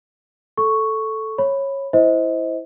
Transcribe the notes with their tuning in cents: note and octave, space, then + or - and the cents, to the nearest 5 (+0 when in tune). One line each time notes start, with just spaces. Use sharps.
A4 +0 C#6 +0
C#5 -15 B5 +0
E4 +0 C5 -10 D#5 +35